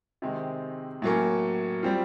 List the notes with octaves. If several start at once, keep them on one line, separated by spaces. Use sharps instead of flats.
C3 D#3 G#3 C4
A2 F#3 A#3 C#4
G3 C4 F4